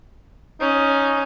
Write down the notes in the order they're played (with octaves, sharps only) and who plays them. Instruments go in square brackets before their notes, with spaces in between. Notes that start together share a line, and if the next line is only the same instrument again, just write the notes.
[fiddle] C#4 [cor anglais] D#4